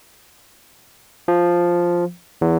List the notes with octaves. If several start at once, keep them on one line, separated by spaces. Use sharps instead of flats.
F3
E2